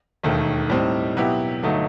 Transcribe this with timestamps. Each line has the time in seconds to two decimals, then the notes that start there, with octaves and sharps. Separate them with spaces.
0.23 E1 D#2 D#3 A3
0.70 A2 G3 C4 D#4
1.17 B2 F#3 B3 E4 G4
1.63 G1 F#3 A3 D#4